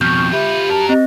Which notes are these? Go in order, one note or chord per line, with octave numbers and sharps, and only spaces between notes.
F2 B2 C#6 F6 G6
F4 G4 B4 E5
F#3 A#4 A5
C4 D#5